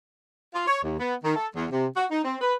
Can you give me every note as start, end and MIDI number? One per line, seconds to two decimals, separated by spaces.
0.54 0.63 65
0.67 0.79 73
0.83 0.97 39
0.99 1.15 59
1.23 1.36 51
1.36 1.48 69
1.55 1.65 40
1.71 1.87 48
1.96 2.05 66
2.10 2.22 63
2.24 2.35 60
2.41 2.54 71